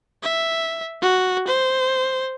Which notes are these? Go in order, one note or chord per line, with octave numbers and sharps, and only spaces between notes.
E5
F#4
C5